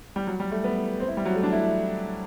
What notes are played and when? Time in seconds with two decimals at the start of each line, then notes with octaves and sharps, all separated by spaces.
0.16 G3
0.27 F#3
0.40 G3
0.52 A3
0.64 B3
1.00 C4
1.08 E4
1.17 G3
1.25 F#3
1.35 A3
1.43 D4
1.52 E4